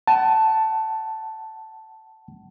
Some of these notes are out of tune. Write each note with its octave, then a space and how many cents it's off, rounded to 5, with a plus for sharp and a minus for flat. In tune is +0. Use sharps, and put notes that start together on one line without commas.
F#5 +35 A5 +0